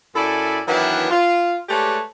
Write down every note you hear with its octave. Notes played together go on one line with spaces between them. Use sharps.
F#2 E4 A4 D5 G#5 B5
D#3 E3 F#3 B3 D4 E4
F4
G#3 A3 G4 B4 C#5 D5